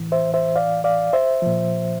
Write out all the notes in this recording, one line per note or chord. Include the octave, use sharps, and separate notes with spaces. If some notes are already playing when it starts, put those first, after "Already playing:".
Already playing: A2 E3
C5 E5
C5 E5
D5 F5
D5 F5
C5 E5
A#2 F3